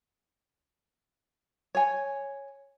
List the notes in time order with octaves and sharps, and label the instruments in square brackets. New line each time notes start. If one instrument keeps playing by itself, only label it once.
[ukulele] C#5 G#5